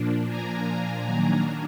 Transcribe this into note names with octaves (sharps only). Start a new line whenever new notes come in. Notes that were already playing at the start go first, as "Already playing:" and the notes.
Already playing: A#2 F3 A#3 D4
G#5 A#5
D#3 F#3 A#3 D4